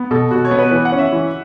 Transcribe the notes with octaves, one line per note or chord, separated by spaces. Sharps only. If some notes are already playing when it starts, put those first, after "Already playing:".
Already playing: B3
B2 A4
B2 F#4
C#5
B3
B4
E3 B4
F#5
C#4
E5
E3